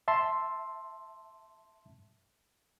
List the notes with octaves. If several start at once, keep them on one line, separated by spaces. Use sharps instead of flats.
E5 A5 C6